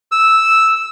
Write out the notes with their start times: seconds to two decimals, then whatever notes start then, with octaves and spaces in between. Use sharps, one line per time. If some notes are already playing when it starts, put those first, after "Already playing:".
0.12 E6